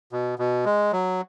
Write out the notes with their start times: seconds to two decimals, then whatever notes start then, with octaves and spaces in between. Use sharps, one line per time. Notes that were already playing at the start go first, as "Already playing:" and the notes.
0.12 B2
0.39 B2
0.66 G#3
0.92 F#3